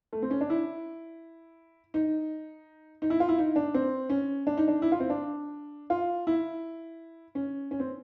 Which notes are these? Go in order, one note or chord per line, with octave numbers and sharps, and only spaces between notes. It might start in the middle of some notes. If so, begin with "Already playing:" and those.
A3
C4
C#4
D4
E4
D#4
D#4
E4
F4
E4
D#4
D4
C4
C#4
D4
D#4
D4
E4
F4
C4
D4
F4
E4
C#4
C#4
C4